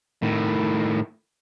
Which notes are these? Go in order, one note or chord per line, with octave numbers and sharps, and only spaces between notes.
A2 D#3